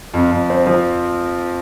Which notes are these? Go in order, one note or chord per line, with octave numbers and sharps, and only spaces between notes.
F2
F2
C4
F3